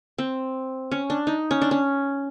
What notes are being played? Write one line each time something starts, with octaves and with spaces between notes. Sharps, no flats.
C4
C#4
D4
D#4
C#4
D4
C#4